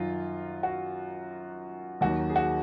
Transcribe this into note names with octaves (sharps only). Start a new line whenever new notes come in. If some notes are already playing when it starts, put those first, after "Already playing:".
Already playing: F#2 D#3 F#3 F4
F#4
D#2 D#3 F#3 F#4
G#4
F#4